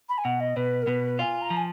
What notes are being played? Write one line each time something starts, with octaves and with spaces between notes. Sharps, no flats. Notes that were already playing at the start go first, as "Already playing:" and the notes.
B5
G#5
B2 F#5
D#5
B2 B4
A#4
B2 B4
F4 G#5
A#5
F3
G#5